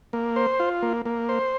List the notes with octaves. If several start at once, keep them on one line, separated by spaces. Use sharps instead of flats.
A#3
C5
F4
A#3
A#3
C5